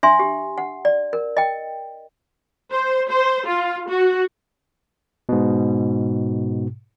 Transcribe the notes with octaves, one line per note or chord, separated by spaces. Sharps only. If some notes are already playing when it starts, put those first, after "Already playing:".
D4 E5 G#5 C6
G4
F#5
D5
A#4
D#5 G5
C5
C5
F4
F#4
G#2 B2